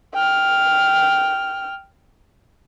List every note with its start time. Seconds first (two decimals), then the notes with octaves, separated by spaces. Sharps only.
0.14 G5 F6